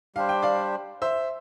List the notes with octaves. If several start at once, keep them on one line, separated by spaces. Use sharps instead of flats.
G3 D4 G4 C5 F5
G5
D5 F5
C5 E5